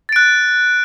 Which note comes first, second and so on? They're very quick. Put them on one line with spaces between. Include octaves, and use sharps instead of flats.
A6 D7 F#6